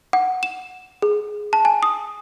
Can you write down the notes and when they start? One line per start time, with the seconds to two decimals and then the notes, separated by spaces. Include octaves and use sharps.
0.13 F#5
0.43 E7
1.02 G#4
1.53 A5
1.65 G#5
1.83 D#6